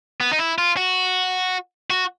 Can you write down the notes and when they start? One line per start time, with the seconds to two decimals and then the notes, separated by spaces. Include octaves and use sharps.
0.20 B3
0.32 D#4
0.39 E4
0.58 F4
0.77 F#4
1.90 F#4